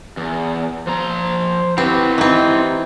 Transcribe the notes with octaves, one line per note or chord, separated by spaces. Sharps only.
E2
F3 C5 A#5
C4 E4 F#4 G4 B4
E3 C4 D#4